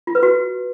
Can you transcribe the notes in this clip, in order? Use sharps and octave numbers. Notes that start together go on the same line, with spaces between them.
F4
B4
F#4